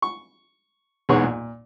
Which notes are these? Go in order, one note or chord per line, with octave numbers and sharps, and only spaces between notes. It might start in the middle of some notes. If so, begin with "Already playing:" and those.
C#6
B1 E2 G#2 G#4 B4 C#5
A#2